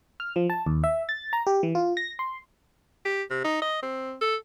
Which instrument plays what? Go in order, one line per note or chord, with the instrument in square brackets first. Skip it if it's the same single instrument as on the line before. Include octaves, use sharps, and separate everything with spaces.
[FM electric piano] F6
F3
A5
D#2
E5
A6
A#5
G4
E3
F4
A#6
C6
[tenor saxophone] G4
C3
D#4
D#5
C4
A4